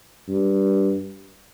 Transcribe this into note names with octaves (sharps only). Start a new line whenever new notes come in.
G2